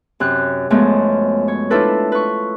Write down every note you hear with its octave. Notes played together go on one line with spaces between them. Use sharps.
F#2 C3 F#6 G6
F#2 F3 F#3 G#3 A3 B3
C#5
D4 E4 F4 A4 B4
B4 C#6